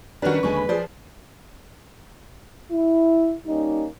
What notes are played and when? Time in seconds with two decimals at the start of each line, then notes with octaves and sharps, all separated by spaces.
0.22 D#3 G3 C#4 D4 F#4 B4
0.43 D#2 D3 G#3 G#5 C#6
0.56 B5
0.69 F3 G#4 C5 D5
2.71 E4
3.46 G3 A#3 C#4 D#4